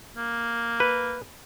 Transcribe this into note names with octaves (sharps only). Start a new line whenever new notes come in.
A#3
B4